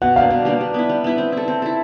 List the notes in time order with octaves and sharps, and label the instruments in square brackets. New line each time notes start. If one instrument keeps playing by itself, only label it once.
[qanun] B2 [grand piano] F#5
[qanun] G3 A#3 D4 [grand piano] F5
[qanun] B2
G3 A#3 D4
G3
B3 E4
G3
B3 E4
C4
E4 A4
C4
E4 A4